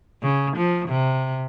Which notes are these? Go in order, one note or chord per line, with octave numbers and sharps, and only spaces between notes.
C#3
F3
C3